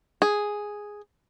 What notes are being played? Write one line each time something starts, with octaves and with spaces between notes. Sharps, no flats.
G#4